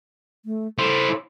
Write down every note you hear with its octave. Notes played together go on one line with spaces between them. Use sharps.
A3
E4 A4 C5